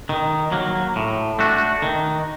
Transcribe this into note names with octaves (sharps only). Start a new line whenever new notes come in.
D#3
F#3 A#3
A2
A3 D4 F#4
D#3